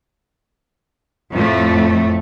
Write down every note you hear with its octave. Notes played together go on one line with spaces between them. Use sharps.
F2 A2 A3